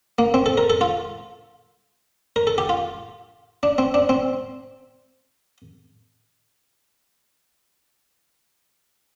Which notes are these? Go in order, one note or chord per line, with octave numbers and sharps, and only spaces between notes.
A#3
C4
A4
A#4
A4
F4
A#4
A4
G4
F4
D4
C4
D4
C4